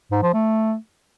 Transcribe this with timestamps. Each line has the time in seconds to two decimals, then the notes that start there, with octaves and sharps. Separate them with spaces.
0.11 G#2
0.23 F3
0.34 A3